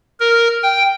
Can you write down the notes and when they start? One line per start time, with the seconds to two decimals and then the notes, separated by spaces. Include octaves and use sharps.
0.20 A#4
0.63 G5